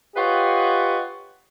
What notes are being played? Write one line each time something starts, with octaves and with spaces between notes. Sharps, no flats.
F4 G4 B4 C#5 D#5 F#5